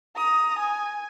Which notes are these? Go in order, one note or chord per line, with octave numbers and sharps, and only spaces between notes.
A#5 D#6
G#5